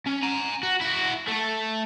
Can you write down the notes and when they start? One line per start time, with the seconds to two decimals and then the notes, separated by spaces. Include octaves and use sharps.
0.07 C#4
0.23 G#5 A#5
0.63 F#4
0.81 E4 F#4
1.28 A3 A4